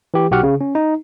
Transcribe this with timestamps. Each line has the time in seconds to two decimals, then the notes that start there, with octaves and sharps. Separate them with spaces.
0.14 E3 G4
0.31 B1 F#4 G4 F#5 F6
0.43 C#3
0.61 C#4
0.75 D#4